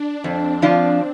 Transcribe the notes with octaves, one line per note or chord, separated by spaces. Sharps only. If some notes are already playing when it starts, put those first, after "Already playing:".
Already playing: D4
F2 C4
F3 D4 F4